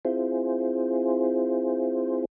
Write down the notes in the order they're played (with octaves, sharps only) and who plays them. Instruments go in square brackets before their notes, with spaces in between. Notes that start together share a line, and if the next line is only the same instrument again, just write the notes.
[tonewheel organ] C4 E4 F4 G#4 C5